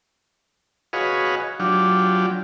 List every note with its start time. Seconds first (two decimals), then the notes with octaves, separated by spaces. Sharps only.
0.93 F#4 G#4 B4 C#5 D#5 F5
1.60 F#3 D4 F4 G4